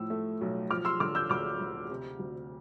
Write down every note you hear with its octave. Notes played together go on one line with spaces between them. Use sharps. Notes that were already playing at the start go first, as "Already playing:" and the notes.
Already playing: A2 F3 E6
A3
B1
F3 D6 F6
C6 E6
D3 D6 F6
E6 G6
D2 D6 F6
D2
C3
D2